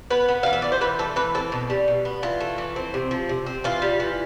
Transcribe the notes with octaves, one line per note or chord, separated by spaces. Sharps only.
B3 B4
B3
E3 F5
E5
E3 D5
C5
E3 B4
A3 A4
E3 B4
C4 A4
B2
G3
B2
B3
E3 F4
A3
E3
C4
C3
F3
C3
C4
E3 F4
G3
E3